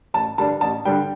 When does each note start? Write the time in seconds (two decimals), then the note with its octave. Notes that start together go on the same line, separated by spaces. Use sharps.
0.14 A1 A5
0.38 G2 D3 G3 D4 A5
0.61 A1 A5
0.85 G2 D3 G3 D4 G5